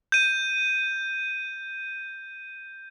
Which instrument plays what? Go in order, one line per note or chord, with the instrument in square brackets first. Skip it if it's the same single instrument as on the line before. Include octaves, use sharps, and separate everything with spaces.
[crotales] G6 D#7